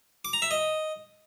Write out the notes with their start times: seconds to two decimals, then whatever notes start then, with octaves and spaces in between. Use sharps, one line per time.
0.25 D6
0.33 A#5
0.42 E5
0.51 D#5